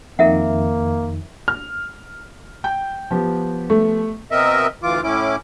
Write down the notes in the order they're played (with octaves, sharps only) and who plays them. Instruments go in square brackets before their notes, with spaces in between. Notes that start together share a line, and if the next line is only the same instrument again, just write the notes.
[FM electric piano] F2 D#3 [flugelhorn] A#3 [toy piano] A#4 E5 F#5
[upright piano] F6
[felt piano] G5 G6
F3 B3 G4
[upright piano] A3
[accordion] B2 C4 A#4 D#5 E5
D2 E3 F4 D6
A2 C#4 E4 D6